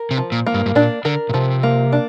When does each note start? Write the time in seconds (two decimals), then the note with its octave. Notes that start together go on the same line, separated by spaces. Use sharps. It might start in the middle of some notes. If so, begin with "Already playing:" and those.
Already playing: A#4
0.11 C3
0.18 F3
0.32 A#2
0.47 A#3
0.54 G2
0.66 G2
0.75 A#2 D4
1.05 D3 A#4
1.29 A#2
1.34 C3 F3
1.63 A#3
1.92 D4